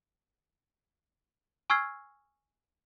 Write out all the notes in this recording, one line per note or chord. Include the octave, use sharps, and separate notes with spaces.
G#5 C#6 E6 F6 G#6 C7